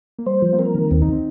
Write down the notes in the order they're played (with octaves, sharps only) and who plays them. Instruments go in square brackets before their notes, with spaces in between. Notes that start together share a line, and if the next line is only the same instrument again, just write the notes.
[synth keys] A#3
[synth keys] G3 [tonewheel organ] C5
[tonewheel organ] F3
[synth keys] A#3
[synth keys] C4 [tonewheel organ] A#4
[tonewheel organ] D#3
[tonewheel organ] D#2 [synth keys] C4
[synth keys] D#4
C4